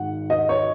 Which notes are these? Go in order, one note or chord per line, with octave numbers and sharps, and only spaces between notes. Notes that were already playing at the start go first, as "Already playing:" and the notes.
Already playing: G#1 G#2 D#3 F#5
D#5
C#5